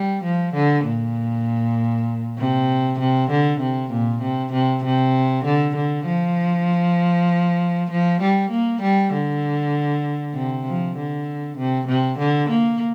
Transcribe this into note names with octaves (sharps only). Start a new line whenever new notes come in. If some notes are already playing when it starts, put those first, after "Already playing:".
Already playing: G3
F3
D3
A#2
C3
C3
D3
C3
A#2
C3
C3
C3
D3
D3
F3
F3
G3
A#3
G3
D3
C3
F3
D3
C3
C3
D3
A#3